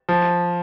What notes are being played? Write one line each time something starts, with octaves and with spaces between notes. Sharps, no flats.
F3